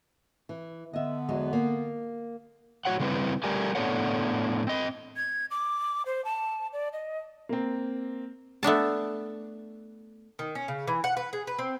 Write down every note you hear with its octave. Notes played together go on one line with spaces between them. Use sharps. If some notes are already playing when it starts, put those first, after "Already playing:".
E3
D3 B3 D#5 E5
E2 F#3 G#3
A#3
A2 A#3 F#4 C#5 F#5
C#3 G3 C4 E4 B4
G3 A3 G4 A#4 D5 G#5
A2 B3 D4 A4 C#5 F#5
C4 D#5
G#6
D6
C5
A5
D5
D#5
A#3 C4
A3 B3 D4 A5
D#3
C#4
C#3
E3
F#5
B4
G#4
B4
C4